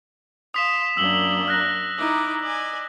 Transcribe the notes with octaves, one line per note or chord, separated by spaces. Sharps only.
F5 C6 D#6 B6 E7
F#2 A#3 D4 E6 F#7 G7
F6 F#6 A#6
D#4 E4 D6
D5 D#5 G#5